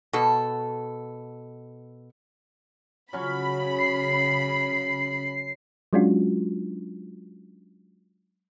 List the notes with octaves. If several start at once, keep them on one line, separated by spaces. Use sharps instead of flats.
B2 A4
C#3 F#3 C#4 B5
C7
F#3 G#3 C#4 D4 F4 F#4